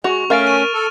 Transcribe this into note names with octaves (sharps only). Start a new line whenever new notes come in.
G#3 F#4 C#6 F7
A3 C#4 A#4 F5 F6 A6 D7
F6 D#7
A4